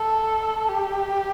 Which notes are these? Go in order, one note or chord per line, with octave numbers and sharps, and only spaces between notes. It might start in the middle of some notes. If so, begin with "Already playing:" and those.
Already playing: A4
G4